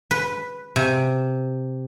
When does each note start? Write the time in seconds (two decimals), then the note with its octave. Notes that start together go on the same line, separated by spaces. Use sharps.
0.11 B4
0.76 C3